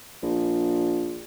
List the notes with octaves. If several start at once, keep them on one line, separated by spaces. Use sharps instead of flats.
A#1